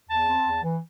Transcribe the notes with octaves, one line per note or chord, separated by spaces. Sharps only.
E2 A5
C4
E2
E3